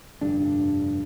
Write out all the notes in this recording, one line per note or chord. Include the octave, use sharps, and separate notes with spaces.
F1 G2 D3 D4